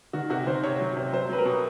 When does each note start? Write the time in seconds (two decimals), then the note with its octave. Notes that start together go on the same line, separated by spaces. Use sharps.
0.13 D#3 F#4
0.30 C3 F#4
0.47 D#3 C5
0.63 C3 C#5
0.80 F#3
0.96 C3
1.13 F#3 C5
1.29 F#3 B4
1.38 A#4
1.45 B2